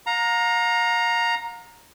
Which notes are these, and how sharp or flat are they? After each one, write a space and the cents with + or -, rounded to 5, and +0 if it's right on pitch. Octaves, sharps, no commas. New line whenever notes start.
F5 +40 A#5 +0